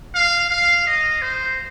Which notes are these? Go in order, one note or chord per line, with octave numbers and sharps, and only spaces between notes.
F5
F5
D#5
C5